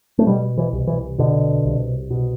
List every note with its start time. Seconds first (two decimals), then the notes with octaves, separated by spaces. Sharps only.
0.19 A3
0.26 B2 G3
0.57 E3
0.73 C2
0.87 E3
1.18 B2 D3
1.65 C2
2.10 B2